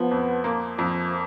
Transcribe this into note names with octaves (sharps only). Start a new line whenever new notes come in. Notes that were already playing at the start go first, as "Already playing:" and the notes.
Already playing: F3 B3
F2
A#3
F2 F3